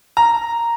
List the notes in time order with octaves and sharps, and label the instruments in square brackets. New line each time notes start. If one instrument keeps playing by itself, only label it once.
[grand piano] A#5